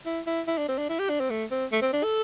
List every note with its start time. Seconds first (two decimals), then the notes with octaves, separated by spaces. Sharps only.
0.06 E4
0.27 E4
0.47 E4
0.58 D4
0.68 C4
0.78 D4
0.89 E4
0.99 G4
1.09 D4
1.20 C4
1.30 A3
1.51 C4
1.72 A3
1.82 C4
1.93 D4
2.03 A4